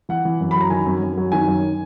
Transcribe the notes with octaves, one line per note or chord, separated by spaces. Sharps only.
E3 F#5
E3
F#2
B5
F#3 A#5
D#3 G#5
F#2
F#2
F#3
D#3 G#5
F#2